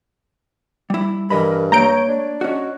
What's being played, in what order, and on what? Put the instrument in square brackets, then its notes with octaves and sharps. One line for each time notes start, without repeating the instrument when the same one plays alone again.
[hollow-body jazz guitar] G3 E4
[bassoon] G2 [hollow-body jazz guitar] E3 D#5 B5 [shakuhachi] A#4
[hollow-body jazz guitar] A3 A#3 [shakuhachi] C#5 [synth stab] A#5 G6 D7
[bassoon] D4
[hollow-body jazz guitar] C#4 F#4 [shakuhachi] D#5